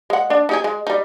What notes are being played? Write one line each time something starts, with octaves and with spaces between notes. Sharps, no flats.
G#3 F#5
D4
D#4 G4 G#4
G#3
G3 D#4